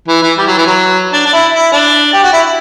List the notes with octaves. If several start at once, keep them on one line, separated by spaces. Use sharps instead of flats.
E3
E3
G3
F#3
E3
F#3
D4
D4
E4
E4
D4
G4
F#4
E4